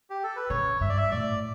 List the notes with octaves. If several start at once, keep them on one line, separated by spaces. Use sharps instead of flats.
G4
A4
B4
C#3 C#5
G2 E5
D5
E5
A2 D5